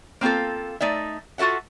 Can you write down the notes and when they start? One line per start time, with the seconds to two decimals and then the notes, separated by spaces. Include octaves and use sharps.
0.21 A#3 C4 D#4 F4 A4
0.81 A3 D#4 D5 E5
1.38 F4 F#4 A4 E5 F#5